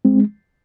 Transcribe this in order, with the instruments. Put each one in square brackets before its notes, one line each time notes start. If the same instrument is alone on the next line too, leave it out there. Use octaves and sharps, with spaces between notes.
[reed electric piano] G#3 C4